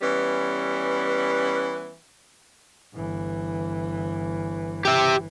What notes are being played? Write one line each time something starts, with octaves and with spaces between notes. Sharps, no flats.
E3 G3 B3 C#4
G1 E3
G4 E5